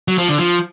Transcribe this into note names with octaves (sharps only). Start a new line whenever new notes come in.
F#3
F3
D3
F3